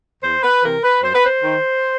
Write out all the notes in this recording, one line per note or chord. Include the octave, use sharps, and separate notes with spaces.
E2 C5
B4
C3 E3 A#4
B4
F#2 C5
B4
C5
D#3